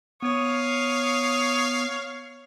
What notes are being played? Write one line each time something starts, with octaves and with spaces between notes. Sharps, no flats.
B3 C#5 F5 D#6